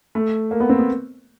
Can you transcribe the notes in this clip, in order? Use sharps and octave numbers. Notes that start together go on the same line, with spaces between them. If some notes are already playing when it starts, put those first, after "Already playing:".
A3
A#3
B3
C4
B3